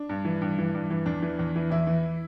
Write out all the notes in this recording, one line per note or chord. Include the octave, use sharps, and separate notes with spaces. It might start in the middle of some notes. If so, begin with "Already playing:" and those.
Already playing: D4
G2
E3
G2
E3
G2
E3
E2 D4
E3
E2
E3
E2 E4
E3